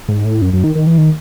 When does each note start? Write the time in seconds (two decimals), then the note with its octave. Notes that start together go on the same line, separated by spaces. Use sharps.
0.09 G#2
0.25 A2
0.42 F#2
0.53 F#2
0.64 D#3
0.75 D#3
0.87 E3
0.98 D#3